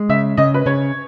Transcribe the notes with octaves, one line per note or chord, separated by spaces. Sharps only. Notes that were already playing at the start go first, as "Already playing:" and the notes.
Already playing: G#3
C#3 E5
C#3 D#5
B4
C#3 C#5